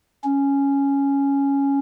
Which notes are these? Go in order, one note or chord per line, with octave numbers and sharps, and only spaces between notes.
C#4